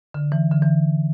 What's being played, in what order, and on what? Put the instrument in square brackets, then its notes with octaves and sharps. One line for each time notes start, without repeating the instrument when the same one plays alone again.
[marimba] D3
E3
D3
E3